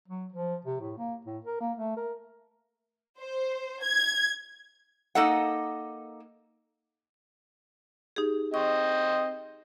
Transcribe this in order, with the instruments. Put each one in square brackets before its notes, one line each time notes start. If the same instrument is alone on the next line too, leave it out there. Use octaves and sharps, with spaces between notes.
[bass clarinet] F#3
F3
C3
A2
A#3
A2
A#4
A#3
A3
A#4
[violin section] C5
G#6
[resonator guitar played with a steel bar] A#3 D#4 A4 D#5 F#5
[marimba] D#4 G4 G#4
[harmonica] C4 D#5 [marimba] C#6